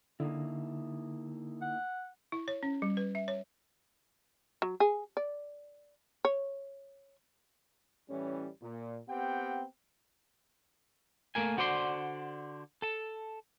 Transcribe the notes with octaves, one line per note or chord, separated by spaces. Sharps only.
D3 A#3 D#4 E4
F#5
E4
C#5
C#4
G3
B4
E5
C#5
F#3
G#4
D5
C#5
A2 E3 G3 C#4
A#2
B3 C4 G4 F#5 G5
A3 A#3 A#4 G#5
D3 F#4 C5 D5 C6
A4 A5